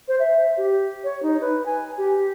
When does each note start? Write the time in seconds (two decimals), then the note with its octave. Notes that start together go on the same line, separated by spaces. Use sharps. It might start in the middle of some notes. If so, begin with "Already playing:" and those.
0.08 C5
0.20 E5
0.57 G4
1.04 C#5
1.23 D#4
1.41 B4
1.66 G#5
1.98 G4